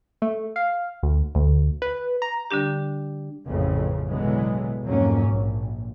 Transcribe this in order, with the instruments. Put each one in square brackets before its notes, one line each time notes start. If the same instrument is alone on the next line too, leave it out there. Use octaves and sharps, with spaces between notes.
[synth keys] A3
F5
D2
D2
B4
A#5
[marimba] D3 G3 D4 G4
[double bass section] A1 F2 C#3
B2 D3 E3 F#3 G#3 B3
F2 G#2 F#3 A#3 C#4
A#1